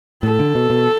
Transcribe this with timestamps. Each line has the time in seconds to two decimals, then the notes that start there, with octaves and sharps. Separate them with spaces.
0.23 A2 A4
0.39 D3
0.55 B2
0.70 B2